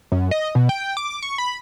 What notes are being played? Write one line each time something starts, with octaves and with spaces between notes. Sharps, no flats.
F#2
D#5
B2
G5
D6
C#6
B5